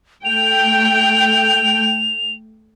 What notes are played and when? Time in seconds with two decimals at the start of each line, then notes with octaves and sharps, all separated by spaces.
0.25 A3 G5 F7